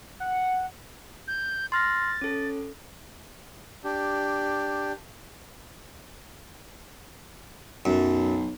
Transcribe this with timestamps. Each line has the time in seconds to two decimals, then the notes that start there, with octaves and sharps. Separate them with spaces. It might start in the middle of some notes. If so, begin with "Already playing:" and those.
0.20 F#5
1.28 G6
1.72 C6 F6 A6 A#6
2.21 C#4 A4
3.84 D4 G4
7.85 B1 F#2